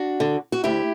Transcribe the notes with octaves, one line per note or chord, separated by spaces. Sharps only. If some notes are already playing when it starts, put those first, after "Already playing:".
Already playing: D4 F#4
D3
F#4
D2 E4 G4